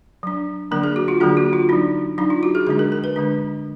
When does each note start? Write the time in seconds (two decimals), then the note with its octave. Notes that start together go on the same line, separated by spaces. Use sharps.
0.23 F#3 D4
0.71 D3 F#3 A#3 D4 A#4
0.84 G#4
0.96 F#4
1.08 F4
1.20 D3 F#3 A#3 D4 G#4
1.37 F#4
1.53 F4
1.69 F#3 D4 D#4
2.18 F#3 D4 D#4
2.30 F4
2.43 F#4
2.55 G#4
2.67 D3 G#3 D4 G#4
2.79 A#4
2.92 A#4
3.04 B4
3.16 D3 G#3 D4